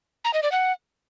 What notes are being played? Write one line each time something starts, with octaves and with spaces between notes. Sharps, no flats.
A#5
D#5
D5
F#5